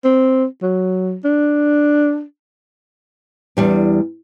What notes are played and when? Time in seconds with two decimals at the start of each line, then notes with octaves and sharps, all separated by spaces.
0.05 C4
0.63 F#3
1.24 D4
3.57 E2 G3 D4